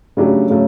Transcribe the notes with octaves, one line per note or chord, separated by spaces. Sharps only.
C#3 F#3 A3 D4 G4
C#3 F#3 A3